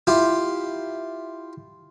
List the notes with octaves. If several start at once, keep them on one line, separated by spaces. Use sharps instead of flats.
E4 F4 G4 F5